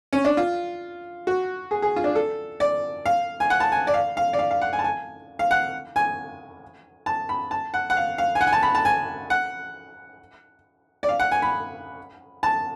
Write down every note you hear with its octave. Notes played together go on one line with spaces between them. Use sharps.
C#4
D4
F4
F#4
G#4
G#4
F4
D4
A4
D5
F5
G#5
F#5
A5
G#5
D5
F5
F5
D5
F5
F5
F#5
G#5
A5
G#5
F5
F#5
G#5
A5
B5
A5
F#5
F#5
F5
F5
G#5
F#5
G#5
A5
B5
A5
G#5
F#5
D5
F5
F#5
G#5
B5
A5